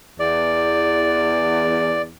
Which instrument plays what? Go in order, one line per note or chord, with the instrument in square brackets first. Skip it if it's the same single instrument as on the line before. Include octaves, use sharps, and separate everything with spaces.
[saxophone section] E2 [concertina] D5